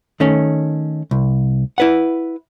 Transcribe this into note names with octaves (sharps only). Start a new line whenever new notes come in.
D#3 A3 C#4
C2
E4 B4 F#5